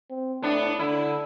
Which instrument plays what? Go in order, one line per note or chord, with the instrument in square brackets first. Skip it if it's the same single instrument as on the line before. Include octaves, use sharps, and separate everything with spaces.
[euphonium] C4
[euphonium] A2 [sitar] B3 D4
[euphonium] D3 [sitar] E4